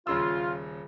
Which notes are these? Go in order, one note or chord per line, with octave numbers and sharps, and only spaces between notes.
D#1 C#3 F4 E6